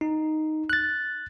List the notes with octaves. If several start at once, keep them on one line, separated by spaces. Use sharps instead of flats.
D#4
F#6 A6